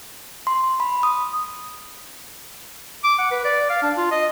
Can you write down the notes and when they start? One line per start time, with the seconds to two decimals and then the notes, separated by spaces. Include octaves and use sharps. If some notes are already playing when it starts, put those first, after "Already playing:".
0.47 C6
0.80 B5
1.03 D#6
3.04 D6
3.19 F#5
3.31 B4
3.45 D5
3.70 F5
3.82 D4
3.97 F4
4.11 D#5